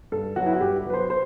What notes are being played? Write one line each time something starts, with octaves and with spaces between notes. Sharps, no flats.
G2 A4
F#3 B3 F#4
E4
F#4
G2 G4
F#3 B3 B4
C5
C5